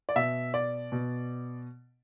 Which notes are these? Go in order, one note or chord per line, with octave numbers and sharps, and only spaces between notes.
D5
B2 E5
D5
B2